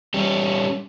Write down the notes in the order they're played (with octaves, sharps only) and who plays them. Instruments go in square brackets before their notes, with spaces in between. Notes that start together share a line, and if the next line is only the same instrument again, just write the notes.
[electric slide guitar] G3 C#4 G4